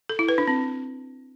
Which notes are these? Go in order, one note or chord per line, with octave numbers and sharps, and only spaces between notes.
A4
E4
B4
D4
C4